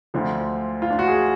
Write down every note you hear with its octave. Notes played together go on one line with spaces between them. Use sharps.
D2 D3 F3
F4
D4
F#4
G#4